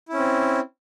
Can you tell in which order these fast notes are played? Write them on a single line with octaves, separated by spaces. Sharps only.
E4 C#4 C4